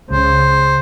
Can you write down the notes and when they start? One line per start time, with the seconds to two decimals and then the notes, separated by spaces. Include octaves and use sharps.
0.11 C#2 C#3 C5